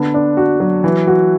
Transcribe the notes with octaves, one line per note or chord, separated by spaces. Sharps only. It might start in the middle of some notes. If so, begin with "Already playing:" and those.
Already playing: D3 B3
D4
F#4
F#3
E3
F#4